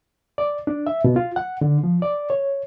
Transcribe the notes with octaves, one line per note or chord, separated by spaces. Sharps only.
D5
D4
E5
B2
F4
F#5
D3
F3
D5
C#5